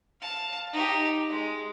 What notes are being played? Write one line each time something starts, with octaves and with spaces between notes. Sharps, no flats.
F5 A5
D#4 G4
G#3